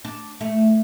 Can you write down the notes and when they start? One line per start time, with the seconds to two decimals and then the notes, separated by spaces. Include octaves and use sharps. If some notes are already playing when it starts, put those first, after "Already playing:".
0.05 D4
0.41 A3